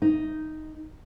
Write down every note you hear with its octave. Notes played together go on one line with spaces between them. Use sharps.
D#4